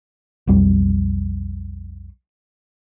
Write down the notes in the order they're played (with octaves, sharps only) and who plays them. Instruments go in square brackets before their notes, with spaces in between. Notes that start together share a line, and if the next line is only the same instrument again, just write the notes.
[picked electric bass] B1 F2 G3